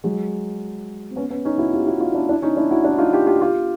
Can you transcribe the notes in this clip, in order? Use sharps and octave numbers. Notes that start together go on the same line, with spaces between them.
F#3 G#3
C4
B3 C#4
B3 C#4
C#4 D#4
E4 F#4
F4 G4
E4 F#4
D#4 F4
D4 E4
D4 E4
C#4 D#4
D4 E4
E4 F#4
D4 E4
D#4 F4
F4 G4
F4 G4
F4 G4